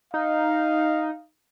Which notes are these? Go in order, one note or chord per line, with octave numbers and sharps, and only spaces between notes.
D#4 F5